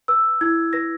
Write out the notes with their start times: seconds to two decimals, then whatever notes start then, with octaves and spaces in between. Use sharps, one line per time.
0.08 B4 E6
0.41 E4 G#6
0.73 B4 A#6